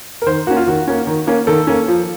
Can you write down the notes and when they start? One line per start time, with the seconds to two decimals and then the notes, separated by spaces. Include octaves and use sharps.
0.22 A#4
0.27 D#3 C5
0.47 A#3 C#4 F#4
0.57 F4
0.67 D#3 F#4
0.88 A#3 C#4
1.07 D#3
1.27 A#3 C#4
1.47 D#3 A4
1.67 A#3 C#4
1.88 F3